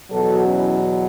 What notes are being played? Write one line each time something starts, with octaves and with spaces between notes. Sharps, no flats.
E2 B2 F#3 F#4 A4
C#4 E4